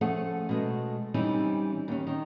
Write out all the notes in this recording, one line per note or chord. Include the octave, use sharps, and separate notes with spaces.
F3 A3 C#4 G#4 A4 F#5
B2 G#3 A3
E3 G3 C4 C#4 D#4 E4
D#2 C#4
D#3